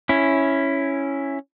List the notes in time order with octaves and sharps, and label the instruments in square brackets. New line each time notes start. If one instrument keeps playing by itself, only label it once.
[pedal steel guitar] C#4 E4